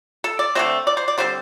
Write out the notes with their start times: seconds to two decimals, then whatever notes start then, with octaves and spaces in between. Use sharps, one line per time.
0.24 A4
0.39 D5
0.55 D3 A3 C4 C5
0.87 D5
0.97 C5
1.08 D5
1.18 D3 G3 C4 C5